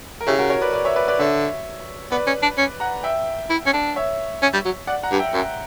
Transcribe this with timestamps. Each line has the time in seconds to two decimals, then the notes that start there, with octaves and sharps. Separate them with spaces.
0.21 A#4
0.27 C#3 E4 G4
0.38 F#4 A#4
0.50 A#4 C#5
0.62 B4 D5
0.73 B4 D5
0.85 C#5 E5
0.96 B4 D5
1.08 B4 D5
1.19 D3 C#5 E5
2.11 B3 B4 D5
2.27 C#4
2.42 D4
2.58 C#4
2.80 F#5 A#5
3.03 E5 G5
3.50 E4
3.66 C#4
3.73 D4
3.96 C#5 E5
4.42 C#4
4.53 G3
4.65 F#3
4.87 D5 F#5
5.03 F#5 A#5
5.11 G2
5.19 E5 G5
5.34 F#2